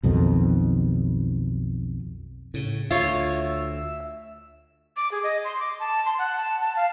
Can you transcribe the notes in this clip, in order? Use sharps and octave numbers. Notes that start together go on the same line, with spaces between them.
B1 F2 B2 D#3
A2 C#3
D2 F4 C#5 E5
D6
G#4
D#5
C6
D6
A5
C6
F#5
A5
A5
F5